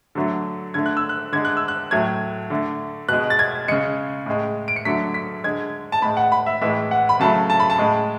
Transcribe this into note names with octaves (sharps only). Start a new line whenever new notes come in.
D3 F#3 A3
D3 A3 G#6
F#6
E6
F#6
D3 G#3 G#6
F#6
E6
F#6
A2 F#3 A3 G#6
D3 A3
B2 G#3 F#6
A6
G#6
C#3 G#3 C#7
A2 G#3
D7
C#7
D3 F#3 A3 B6
B6
D3 G#3 G#6
A5
A2 G#3 B5
F#5
B5
E5
A2 E3 G#3 E5
F#5
B5
C#3 F#3 A3 A5
A5
B5
A5
A2 G#3